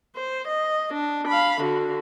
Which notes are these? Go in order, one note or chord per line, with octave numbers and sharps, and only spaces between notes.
C5
D#5
D4
F5 B5
D3 F#4